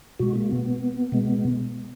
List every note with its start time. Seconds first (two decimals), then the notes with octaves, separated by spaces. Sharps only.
0.19 B2 G#3 F#4
0.36 A#3
0.51 B3
1.12 B2 G#3